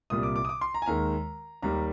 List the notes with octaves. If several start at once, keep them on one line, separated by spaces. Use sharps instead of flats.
C2 A#2 G3 D#6
D6
D6
D#6
D6
C6
A#5
G#5
D#2 D#3 G#3 A#5
D#2 D#3 G3 A#5